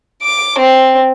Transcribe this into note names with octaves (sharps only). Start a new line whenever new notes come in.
D6
C4